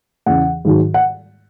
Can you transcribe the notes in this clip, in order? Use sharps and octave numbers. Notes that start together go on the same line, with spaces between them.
E2 C#3 E3 F#5
G#2 D#3 F#3
F#5